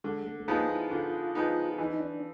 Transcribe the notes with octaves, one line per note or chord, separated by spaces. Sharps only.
D3 G#3
A3
A3
F3 G#3 A#3 B3 D#4
E4
D3 F4
F3 G#3 B3 D#4
E3 D#4
D#4
D4